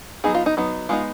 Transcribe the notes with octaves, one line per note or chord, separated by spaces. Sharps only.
F#3 B3 D#4 G#4
F4
D#4
F#3 B3 D#4
G#3 B3 D#4 F4